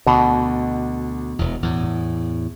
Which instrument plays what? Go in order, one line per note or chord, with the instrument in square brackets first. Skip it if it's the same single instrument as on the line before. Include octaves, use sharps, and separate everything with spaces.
[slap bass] D2 D3 [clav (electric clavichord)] B2
[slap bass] E1 E2
E2 A2